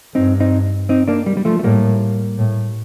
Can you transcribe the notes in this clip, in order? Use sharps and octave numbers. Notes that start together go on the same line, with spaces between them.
G2 C4 D#4
C4 D#4
C4 D#4
A#3 D4
G3
G3
F3 A3
A3
A2 G3 A#3
A2